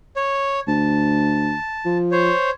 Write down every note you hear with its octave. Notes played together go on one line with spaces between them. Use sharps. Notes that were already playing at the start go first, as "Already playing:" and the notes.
C#5
D2 A5
F3
C5 C#5